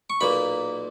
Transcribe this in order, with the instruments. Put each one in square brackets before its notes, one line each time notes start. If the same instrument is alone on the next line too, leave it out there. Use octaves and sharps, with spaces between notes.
[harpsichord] C#6
B1 A#2 A#3 B5